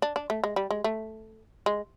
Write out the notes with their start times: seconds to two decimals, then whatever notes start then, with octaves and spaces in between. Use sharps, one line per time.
0.02 D4
0.16 D4
0.30 A3
0.44 G#3
0.56 G3
0.71 G#3
0.84 A3
1.66 G#3